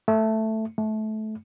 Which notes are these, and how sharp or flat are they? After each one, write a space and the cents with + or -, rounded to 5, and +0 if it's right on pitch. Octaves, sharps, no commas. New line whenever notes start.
A3 +5
A3 -20